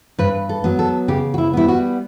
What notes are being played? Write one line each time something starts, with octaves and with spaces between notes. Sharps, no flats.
G2 B4
A4
F#3 B3
A4
C#3 G4
F#4
E4
G3 B3 E4
F#4